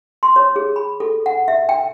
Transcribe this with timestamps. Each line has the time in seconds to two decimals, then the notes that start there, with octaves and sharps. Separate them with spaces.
0.23 C6
0.36 C#5
0.56 G#4
0.76 B5
1.00 A4
1.26 F#5
1.48 E5
1.69 G5